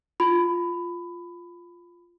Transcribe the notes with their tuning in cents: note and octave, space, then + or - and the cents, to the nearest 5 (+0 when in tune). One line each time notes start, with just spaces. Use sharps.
F4 +0 B5 +20